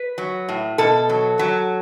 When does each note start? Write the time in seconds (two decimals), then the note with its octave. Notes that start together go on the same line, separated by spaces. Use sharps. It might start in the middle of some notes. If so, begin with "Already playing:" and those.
Already playing: B4
0.18 F#3
0.49 A2
0.78 B2 A4
1.09 F#3
1.39 F#3